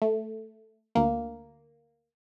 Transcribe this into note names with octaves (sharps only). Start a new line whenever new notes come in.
A3
D2 A#3